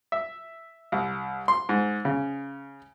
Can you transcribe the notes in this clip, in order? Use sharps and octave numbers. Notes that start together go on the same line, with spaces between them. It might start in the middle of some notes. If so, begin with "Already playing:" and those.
E5
C2
C6
G#2
C#3